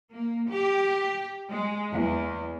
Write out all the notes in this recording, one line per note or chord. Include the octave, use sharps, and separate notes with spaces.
A#3
G4
G#3
E2